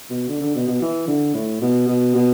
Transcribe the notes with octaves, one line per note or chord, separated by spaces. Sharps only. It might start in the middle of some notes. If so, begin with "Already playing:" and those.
B2
D3
D3
B2
B2
E3
D3
A2
B2
B2
B2